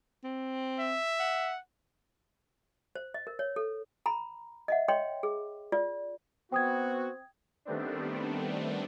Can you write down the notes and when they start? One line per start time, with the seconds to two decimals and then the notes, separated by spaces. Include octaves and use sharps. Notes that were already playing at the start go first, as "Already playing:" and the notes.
0.24 C4
0.79 E5
1.20 F#5
2.95 C5
3.14 D#5
3.27 A#4
3.39 C#5
3.56 A4
4.06 A#5 B5
4.68 D#5 E5 F#5
4.88 C#5 D#5 G5 C6
5.23 G#4
5.72 F4 D5
6.52 B3 C4 F#4 G5 D#6 G#6
7.65 D#3 G3 A3 B3 C4 D4